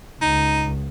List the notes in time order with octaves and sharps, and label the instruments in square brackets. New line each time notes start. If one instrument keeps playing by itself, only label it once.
[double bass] C#2 [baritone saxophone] D#4